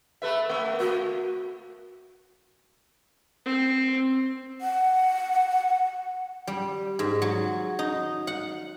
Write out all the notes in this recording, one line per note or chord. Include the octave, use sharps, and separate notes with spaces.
A3 B4 E5
A3
A3 F#4
C4
F#5
G3
G#2
F#3
D#4
F#5